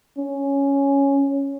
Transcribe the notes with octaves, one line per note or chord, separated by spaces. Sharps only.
C#4